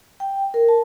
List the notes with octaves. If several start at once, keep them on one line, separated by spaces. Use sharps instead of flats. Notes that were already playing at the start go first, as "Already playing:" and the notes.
G5
A#4
A5